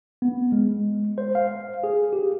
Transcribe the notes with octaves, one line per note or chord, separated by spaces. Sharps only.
B3
G#3
C5
F5
G#4
G4